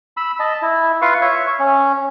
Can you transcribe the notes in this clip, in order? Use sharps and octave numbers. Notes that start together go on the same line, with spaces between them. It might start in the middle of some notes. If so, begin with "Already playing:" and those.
B5 E6
D#5 A5
E4
F4 B4 F5 C#6
C#5 E5
C#4